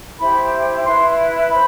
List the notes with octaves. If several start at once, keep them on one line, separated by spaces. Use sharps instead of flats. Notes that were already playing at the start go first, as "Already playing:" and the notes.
E4 G4 C5 B5
E4 B4 C6
C5 B5